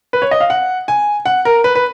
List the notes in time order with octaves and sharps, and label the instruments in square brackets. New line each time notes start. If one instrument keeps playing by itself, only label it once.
[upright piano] B4
C#5
D#5
F5
F#5
G#5
F#5
A#4
B4
B4